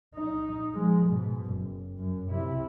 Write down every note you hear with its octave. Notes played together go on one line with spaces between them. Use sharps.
D#4
F3 G#3
G#2 B2
F#1
F#2
C3 E4